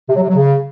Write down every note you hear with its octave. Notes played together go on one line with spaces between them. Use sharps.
C3
F#3
C3
F#3
C#3